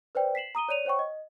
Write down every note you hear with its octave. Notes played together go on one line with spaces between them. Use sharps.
B4 C5 D5 G5
B6 C7 E7 F#7
A#5 D#6 D#7 G7
C#5 D5 D#7 F7
C5 C#5 F#5 G5 C#6
D#5